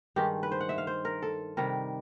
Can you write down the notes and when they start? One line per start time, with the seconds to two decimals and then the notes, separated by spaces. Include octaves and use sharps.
0.16 G2 D#3 G#3 G4
0.43 B4
0.52 C5
0.61 F#5
0.69 E5
0.78 F5
0.87 C5
1.05 A#4
1.22 A4
1.57 C3 D#3 G3 A#4